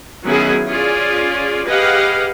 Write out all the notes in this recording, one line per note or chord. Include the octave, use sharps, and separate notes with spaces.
D#3 F#3 B3 C#4 E4 G#4
C#4 F4 G#4 D5
G4 G#4 B4 D#5 F5 F#5